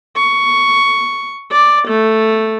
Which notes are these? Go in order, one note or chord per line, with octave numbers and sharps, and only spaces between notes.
C#6
D5
A3